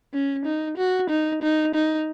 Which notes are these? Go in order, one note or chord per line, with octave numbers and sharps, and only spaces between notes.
C#4
D#4
F#4
D#4
D#4
D#4